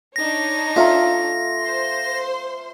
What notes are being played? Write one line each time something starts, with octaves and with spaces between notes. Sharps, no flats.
D4 D#4 C#5 A#6
A3 F4 F5 A#5
C5 C6